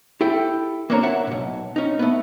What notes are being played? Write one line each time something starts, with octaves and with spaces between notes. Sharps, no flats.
E4 G4 A4 G5
A#3 C4 D4 C#5 F#5 A#5
C#5 E5 F#5 A5
B1 A#2
C#4 D#4
A3 B3